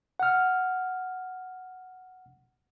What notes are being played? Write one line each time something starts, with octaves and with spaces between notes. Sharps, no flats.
F#5 F6